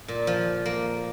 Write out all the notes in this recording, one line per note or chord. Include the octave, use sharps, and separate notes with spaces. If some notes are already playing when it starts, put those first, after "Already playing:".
A#2
F3
A#3